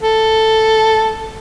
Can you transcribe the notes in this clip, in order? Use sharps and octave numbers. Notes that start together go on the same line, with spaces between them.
A4